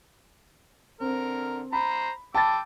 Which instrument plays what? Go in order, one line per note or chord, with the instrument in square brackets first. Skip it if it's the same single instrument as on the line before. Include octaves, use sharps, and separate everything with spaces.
[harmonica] D3 A#4 [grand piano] C4
[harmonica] C5 A#5 [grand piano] B5
[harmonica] G5 D6 E6 [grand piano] A5 B5 A6